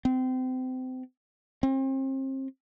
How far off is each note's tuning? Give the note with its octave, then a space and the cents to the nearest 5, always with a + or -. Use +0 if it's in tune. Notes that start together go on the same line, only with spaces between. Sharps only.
C4 -30
C4 +35